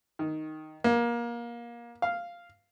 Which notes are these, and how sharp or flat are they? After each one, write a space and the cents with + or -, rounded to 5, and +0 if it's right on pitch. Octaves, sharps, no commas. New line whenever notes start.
D#3 +5
A#3 +25
F5 -5